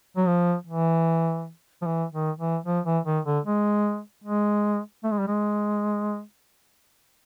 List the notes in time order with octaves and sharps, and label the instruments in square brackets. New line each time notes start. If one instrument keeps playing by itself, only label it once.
[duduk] F#3
F3
E3
F3
E3
D#3
E3
F3
E3
D#3
D3
G#3
G#3
A3
G#3
G3
G#3